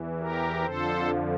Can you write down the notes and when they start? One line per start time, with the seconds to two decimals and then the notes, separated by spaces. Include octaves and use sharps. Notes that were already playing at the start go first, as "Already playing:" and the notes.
Already playing: E2 E3
0.20 G4 A#4
0.64 F2 D3 F3 A4 C5